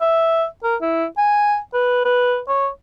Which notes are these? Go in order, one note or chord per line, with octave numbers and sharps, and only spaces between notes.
E5
A#4
E4
G#5
B4
B4
C#5